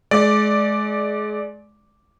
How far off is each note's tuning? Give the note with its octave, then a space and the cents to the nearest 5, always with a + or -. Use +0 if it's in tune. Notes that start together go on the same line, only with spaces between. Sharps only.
G#3 +30 D5 +0